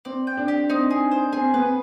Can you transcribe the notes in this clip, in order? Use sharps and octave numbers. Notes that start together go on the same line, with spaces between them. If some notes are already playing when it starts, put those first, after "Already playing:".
C4 D5
G5
D4
G4
C4 D#4
G#4
C5
C4 G#4
B3 B4